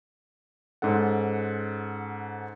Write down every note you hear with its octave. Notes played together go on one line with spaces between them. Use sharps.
G#2 C#4 A4 F#5